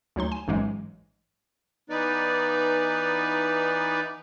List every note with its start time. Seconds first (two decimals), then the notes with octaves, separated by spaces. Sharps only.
0.16 D2 F#3 D#4 C6
0.32 G#5
0.48 A1 G#2 E3 F#3 G#3
1.90 E3 B3 D#4 B4 D5